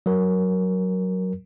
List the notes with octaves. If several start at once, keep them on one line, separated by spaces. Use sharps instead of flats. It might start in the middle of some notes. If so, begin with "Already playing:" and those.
F#3 A#4